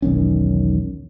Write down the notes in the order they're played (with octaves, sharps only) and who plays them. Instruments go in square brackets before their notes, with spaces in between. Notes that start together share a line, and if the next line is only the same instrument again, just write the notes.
[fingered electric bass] E1 B1 D#3 C#4